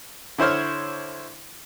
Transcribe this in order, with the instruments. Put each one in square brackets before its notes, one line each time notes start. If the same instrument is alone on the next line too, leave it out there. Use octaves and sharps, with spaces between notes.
[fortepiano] D3 E4 C5 C#5 F6